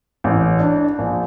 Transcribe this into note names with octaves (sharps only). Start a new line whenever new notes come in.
A1
D4
A#1